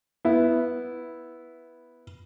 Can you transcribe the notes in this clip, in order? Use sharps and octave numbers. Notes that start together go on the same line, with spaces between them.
B3 E4